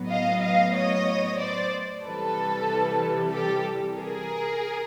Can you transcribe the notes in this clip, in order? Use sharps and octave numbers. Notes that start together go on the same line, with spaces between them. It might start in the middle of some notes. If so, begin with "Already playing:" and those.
Already playing: A2 F#3 B3
D#5 F5
D#5 F5
C#5 D#5
C5 D5
C3 E3 G3 A4 B4
G4 A4
G#4 A#4